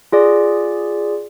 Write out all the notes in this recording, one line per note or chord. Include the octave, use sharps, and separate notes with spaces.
F4 G#4 D5